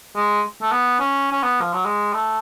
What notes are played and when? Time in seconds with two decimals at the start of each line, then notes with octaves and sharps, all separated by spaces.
0.16 G#3
0.62 A3
0.72 B3
1.00 C#4
1.32 C#4
1.43 B3
1.61 F3
1.73 F#3
1.85 G#3
2.14 A3